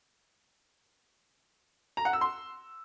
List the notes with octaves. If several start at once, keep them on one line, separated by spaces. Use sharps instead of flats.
A#5
F#5
E6
C6